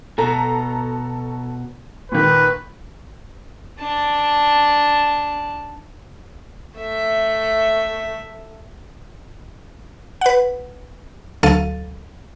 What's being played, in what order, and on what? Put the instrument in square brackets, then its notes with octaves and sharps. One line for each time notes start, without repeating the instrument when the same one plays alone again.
[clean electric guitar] B2 [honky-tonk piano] A4 A#5
[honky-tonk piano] A#2 D#3 [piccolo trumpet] B4
[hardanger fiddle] D4 A5
A3 E5
[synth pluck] B4 F#5
D2 F#3 A4 F5 A6 D#7